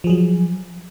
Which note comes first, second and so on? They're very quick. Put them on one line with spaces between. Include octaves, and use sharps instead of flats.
F3 G#4 F#3